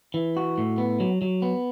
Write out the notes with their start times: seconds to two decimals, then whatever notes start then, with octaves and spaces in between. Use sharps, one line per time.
0.14 E3
0.37 F#4
0.58 A2
0.78 B3
1.00 F#3
1.22 F#3
1.42 B3